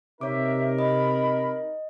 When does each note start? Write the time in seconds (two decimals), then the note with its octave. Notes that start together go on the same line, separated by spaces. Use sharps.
0.21 C3 D#4 A#4 C#5 E5 D6
0.79 D#5 B5